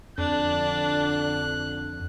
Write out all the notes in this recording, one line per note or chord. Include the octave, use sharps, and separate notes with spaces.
F2 D3 D4 F#6